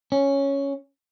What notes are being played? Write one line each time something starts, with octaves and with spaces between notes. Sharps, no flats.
C#4